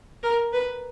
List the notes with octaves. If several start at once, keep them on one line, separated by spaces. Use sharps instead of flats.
A#4
B4